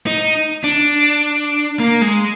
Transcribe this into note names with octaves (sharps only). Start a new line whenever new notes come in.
D#4
D4
A#3
G#3